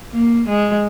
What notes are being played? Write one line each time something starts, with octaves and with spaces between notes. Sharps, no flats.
A#3
G#3